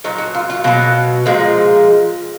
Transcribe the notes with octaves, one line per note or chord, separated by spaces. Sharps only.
A#2 F#3 D#4
F#4
F4
F4
B2 F#3 A#3
A#2 F3 G#3 A#3